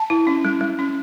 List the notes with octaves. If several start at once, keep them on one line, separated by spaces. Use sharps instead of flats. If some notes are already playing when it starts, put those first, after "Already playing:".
Already playing: A5
E4
C#4
G3
G3
C#4